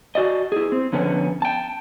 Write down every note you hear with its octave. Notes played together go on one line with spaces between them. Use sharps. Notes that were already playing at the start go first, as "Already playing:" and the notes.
F#4 D5 D#5
E4 G#4
C4
F2 D3 B3 C#4
G5 A5